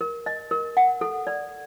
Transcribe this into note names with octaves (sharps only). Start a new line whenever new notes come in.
A#4
D#5
A#4
F#5
A4
D5